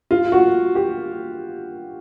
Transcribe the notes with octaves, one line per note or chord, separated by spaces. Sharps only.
F4
F#4
G4